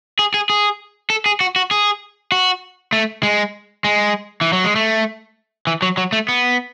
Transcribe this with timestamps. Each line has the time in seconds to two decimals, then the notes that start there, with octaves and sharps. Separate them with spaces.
0.19 G#4
0.34 G#4
0.50 G#4
1.10 A4
1.26 G#4
1.41 F#4
1.56 F#4
1.71 G#4
2.32 F#4
2.93 A3
3.23 G#3
3.84 G#3
4.41 E3
4.53 F#3
4.64 G#3
4.76 A3
5.67 E3
5.82 F#3
5.97 F#3
6.12 A3
6.29 B3